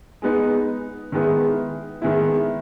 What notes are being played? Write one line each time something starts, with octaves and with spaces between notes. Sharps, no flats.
G#3 B3 D#4
D#3 G#3 B3 E4
D#3 G#3 B3 E4